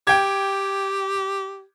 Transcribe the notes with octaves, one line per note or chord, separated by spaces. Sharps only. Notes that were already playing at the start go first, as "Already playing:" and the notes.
G4 G5 G#6